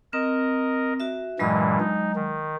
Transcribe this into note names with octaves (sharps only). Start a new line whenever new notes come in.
C4 A#4 D#5
F#4 E5
G2 A#2 E3 F#3 G#3 D#5
D#4
D#3